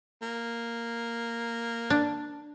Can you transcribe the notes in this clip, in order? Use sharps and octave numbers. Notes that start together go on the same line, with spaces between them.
A#3
D4